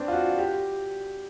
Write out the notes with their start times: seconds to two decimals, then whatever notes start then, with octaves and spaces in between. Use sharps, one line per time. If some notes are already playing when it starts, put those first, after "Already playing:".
Already playing: B3 C4 D4
0.08 F4
0.12 F#4
0.38 G4